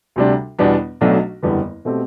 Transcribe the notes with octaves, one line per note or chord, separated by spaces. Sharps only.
D2 C3 G3 D4
E2 B2 G3 B3 D4
B1 B2 F#3 A3 D4
F#1 E2 D3 G3 B3
B2 A3 C4 G4